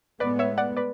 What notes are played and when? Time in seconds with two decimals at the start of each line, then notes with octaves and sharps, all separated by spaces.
0.20 A2 G#3 B3 B4 D5
0.39 C#5 E5
0.58 D5 F#5
0.77 B4 D5